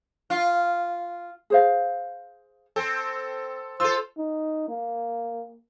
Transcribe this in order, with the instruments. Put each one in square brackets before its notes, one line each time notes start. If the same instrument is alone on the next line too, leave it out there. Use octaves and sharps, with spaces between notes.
[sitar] F4
[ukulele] G#4 C5 F5
[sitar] C4 [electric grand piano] A4
[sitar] F4 A4 [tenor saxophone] C5 [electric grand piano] E6
[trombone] D#4
A#3